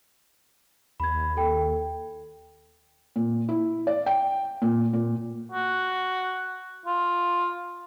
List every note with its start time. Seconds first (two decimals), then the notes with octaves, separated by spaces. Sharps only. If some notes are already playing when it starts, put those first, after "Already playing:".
1.00 D#2 B5 G#6
1.37 A4 G5
3.16 A#2
3.49 E4
3.87 D5
4.06 G5
4.62 A#2
4.93 A#2
5.52 F#4
6.86 F4